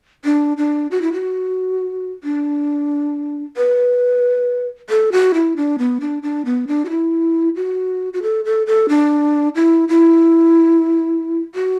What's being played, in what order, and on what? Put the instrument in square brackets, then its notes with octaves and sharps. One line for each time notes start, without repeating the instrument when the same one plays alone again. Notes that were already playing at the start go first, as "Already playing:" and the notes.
[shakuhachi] D4
D4
F#4
E4
F#4
D4
B4
A4
F#4
E4
D4
B3
D4
D4
B3
D4
F#4
E4
F#4
F#4
A4
A4
A4
D4
E4
E4
F#4